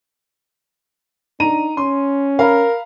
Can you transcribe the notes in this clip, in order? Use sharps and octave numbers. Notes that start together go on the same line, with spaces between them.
D4 D#4 A#5 D#7
C#4 C6
A#4 F5 A#5 B5